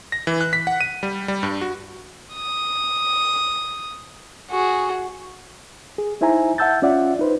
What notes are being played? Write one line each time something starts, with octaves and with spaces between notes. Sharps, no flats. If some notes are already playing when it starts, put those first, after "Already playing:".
A#6
E3
F#6
B6
F#5
D#7
G3
G3
G2
F#4
D#6
F#4 G#4
G#4
D#4 E4 C5 E5 G#5 A#5
E5 F#5 A5 E6 G6 A6
C#4 F4 D5 E5 F#5
D#4 B4 C5